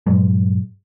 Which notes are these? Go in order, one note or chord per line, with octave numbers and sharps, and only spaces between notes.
G2 A#2 F#3 G#3